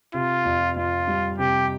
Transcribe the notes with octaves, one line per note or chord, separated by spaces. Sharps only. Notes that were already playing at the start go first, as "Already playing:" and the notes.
C3 F4
F2
F2 F4
G3
C3 G4